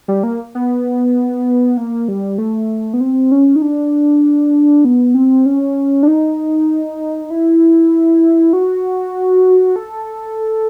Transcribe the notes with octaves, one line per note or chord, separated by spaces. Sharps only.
G3
A#3
B3
A#3
G3
A3
B3
C4
C#4
D#4
D4
B3
C4
C#4
D4
D#4
E4
F#4
A4